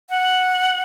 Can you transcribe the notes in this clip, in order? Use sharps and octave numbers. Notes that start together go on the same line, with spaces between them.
F#5